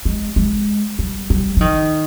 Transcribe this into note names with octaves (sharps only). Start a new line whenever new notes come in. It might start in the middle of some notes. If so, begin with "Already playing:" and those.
G#3
G#3
G3
G3
F3
D#3